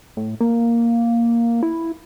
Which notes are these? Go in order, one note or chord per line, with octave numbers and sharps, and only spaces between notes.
A2
A#3
E4